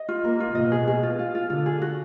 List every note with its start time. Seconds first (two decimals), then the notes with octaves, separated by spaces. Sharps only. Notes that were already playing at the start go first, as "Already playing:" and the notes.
Already playing: D#5
0.09 F4
0.24 A#3 A#4
0.40 F4
0.55 B2 D#5
0.72 G#4
0.88 G#4
1.03 F4
1.19 F4
1.35 F4
1.50 D3 F4
1.66 G#4
1.82 F#4